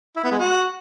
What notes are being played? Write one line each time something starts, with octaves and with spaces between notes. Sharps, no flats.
E4
B3
G#3
F#4